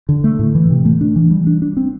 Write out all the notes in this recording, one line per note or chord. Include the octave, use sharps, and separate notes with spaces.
D3
A3
A2
E3
C3
A3
D4
E3
G3
D4
D4
C4